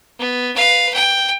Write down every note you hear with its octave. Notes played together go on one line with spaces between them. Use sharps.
B3
B4 F5
G5